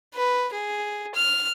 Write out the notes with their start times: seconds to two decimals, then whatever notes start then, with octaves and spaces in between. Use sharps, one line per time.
0.14 B4
0.53 G#4
1.14 F6